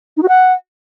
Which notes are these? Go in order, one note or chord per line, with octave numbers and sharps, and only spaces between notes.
D#4
F#4
F#5